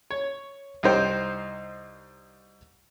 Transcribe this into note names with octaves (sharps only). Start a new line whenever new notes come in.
C#5
C2 D#4 C5 G5